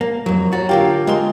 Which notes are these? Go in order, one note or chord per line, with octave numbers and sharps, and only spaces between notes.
A#3
F2 F#3
F#4 C#5 A#5 A6
D3 A#3 F4 G4 F5 G5
G#3 A#4 C6